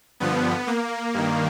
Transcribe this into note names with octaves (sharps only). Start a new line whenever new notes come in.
G2 D3 F3 B3
A#3
G2 D#3